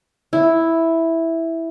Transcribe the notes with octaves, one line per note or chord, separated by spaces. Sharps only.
E4